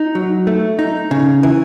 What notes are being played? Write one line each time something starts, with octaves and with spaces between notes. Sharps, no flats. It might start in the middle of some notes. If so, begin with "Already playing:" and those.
Already playing: D#4
F#3
A3
D#4
C#3
E3